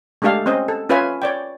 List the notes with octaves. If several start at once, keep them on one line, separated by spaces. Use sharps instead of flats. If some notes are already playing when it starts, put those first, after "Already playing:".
G#3 A3 D4 G4 A4 F5
C4 C#4 C5 D#5
A4
C#4 F4 B4 C#5 E5 G#5
C#5 D5 G5